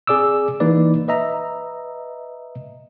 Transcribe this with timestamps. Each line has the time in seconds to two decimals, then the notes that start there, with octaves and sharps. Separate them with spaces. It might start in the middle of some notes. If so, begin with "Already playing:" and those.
0.07 C4 G#4 D5 D6 E6
0.60 E3 A#3 D#4 B4 D5
1.08 B4 D#5 E5 A#5